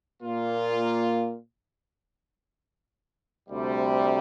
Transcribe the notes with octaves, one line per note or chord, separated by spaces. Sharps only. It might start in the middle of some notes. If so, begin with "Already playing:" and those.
A#2 A#3 F4
D2 C3 G3